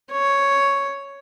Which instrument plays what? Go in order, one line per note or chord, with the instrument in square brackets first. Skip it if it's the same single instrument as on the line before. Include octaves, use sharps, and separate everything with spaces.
[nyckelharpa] C#5